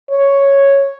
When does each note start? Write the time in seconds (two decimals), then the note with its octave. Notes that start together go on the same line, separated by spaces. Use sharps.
0.11 C#5